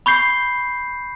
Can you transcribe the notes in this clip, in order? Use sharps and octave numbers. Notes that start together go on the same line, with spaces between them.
B5 C#6 G6 C7